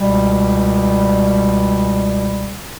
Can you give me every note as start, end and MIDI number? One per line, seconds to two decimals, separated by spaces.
0.01 2.57 37
0.01 2.57 47
0.01 2.57 55